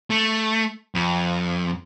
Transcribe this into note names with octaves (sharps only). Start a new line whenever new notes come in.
A3
F2